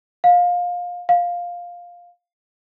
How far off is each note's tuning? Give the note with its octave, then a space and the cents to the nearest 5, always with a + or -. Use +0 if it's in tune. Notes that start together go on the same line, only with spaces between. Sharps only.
F5 +20
F5 +10